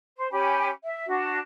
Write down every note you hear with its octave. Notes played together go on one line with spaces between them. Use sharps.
C5
C#4 G4 G#5 B5
E5
D4 F#4